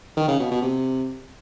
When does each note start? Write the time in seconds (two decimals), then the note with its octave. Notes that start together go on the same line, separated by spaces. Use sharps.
0.17 D#3
0.28 C#3
0.40 B2
0.51 B2
0.62 C3